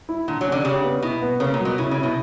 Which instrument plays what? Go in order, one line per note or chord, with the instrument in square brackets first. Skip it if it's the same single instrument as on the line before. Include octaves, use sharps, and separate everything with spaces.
[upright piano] E4
[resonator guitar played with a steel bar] A#2 [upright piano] D3
[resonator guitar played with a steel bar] F#3
[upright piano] C#4
[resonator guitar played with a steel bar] D3
[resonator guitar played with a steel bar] C#3 [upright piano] G4
[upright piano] B3
[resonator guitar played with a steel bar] B2 [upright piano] E4
[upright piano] B3
[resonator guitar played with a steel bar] C#3 [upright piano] A#3
[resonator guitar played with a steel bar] A#2
[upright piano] F#3
[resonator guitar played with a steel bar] B2
[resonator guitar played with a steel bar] C#3 [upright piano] E4
[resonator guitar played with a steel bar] C#3
[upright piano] E4
[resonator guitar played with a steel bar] B2